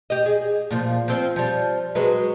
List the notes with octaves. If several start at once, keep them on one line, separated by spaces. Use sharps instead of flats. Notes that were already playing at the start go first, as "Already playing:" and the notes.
G4 D#5
G#4
A#2 F3
F3 C4
F3 G3
F#3 G#3 B4